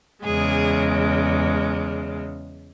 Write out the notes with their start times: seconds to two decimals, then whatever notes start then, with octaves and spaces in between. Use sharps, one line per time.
0.23 E2 C#3 G#3 G#4